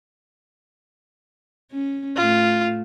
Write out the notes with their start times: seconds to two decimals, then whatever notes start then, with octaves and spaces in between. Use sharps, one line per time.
1.71 C#4
2.16 A2 A3 F4